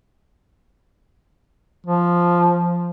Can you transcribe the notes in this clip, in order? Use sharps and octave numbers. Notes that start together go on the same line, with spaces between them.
F3